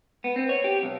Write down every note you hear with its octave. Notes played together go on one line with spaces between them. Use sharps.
B3
C4
C#5
G4
B1